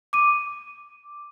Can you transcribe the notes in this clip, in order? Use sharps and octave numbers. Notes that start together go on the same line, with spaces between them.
D6 D#7